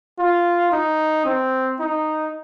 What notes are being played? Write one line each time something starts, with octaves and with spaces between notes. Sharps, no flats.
F4
D#4
C4
D#4